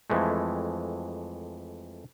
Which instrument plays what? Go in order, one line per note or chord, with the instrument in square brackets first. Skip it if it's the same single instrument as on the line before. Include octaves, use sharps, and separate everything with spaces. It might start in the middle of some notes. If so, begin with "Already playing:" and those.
[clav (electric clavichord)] F2 E3 G#3 A3